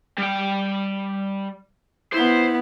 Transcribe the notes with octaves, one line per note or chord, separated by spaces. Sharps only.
G3 G5
B3 E4 C5